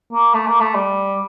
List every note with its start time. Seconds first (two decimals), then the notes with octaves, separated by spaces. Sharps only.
0.13 A#3
0.34 A3
0.47 A#3
0.60 A3
0.75 G3